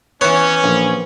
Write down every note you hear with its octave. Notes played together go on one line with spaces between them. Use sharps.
E3 B3 C#4 C#5
A#1